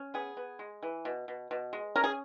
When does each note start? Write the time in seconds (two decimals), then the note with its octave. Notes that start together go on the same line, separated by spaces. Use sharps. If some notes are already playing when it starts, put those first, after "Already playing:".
Already playing: C#4
0.14 B3 G#4
0.37 B3
0.59 G#3
0.83 E3
1.05 B2
1.28 B2
1.51 B2
1.73 G#3
1.96 C#4 A#4
2.04 G#4